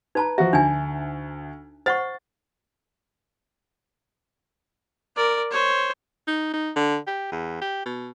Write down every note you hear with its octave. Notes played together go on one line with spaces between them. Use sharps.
D#4 B4 A5 A#5
F3 F#4 E5
D2 D4 D#4 G#5
C5 F#5 C#6 A6
A#4 D5
C5 C#5
D#4
D#4
D3
G4
E2
G4
B2